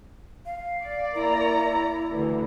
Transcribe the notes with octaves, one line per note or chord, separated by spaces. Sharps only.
F5
D5
A#3 E4 A#5
D2 D3 E3